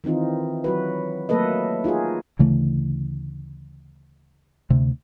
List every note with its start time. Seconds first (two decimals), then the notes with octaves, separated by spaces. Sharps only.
0.04 D#3 E3 C4 D#4 F4
0.64 F#3 F#4 B4
1.29 F#3 A3 A#3 A4 B4 D#5
1.84 D#4 F4 F#4 G#4
2.39 D2 C#3 E3 A3
4.70 D2 C3